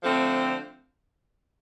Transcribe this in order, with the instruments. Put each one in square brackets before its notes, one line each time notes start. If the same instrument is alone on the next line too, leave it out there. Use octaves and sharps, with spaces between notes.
[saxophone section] D3 F3 A3 C4